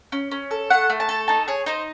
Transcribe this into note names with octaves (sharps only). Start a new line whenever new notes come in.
C#4
C#4
A4
A3 F#5
A3
A5
A4
D#4 A5
G#4 C#5
D#4 C5